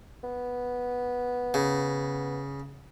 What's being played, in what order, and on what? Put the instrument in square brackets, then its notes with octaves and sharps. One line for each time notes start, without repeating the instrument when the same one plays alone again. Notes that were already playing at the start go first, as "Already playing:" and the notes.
[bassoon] B3
[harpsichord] C#3